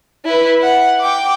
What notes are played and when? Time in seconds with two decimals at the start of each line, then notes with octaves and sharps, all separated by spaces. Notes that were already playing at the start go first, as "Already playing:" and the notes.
0.25 E4 B4
0.62 F#5
1.00 G5 D6